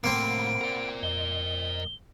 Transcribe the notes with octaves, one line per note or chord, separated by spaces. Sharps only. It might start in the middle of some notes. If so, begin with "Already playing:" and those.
A2 C3 A#3 C4 F#5 B5 D7
A#4 D5
F2 D#5 G7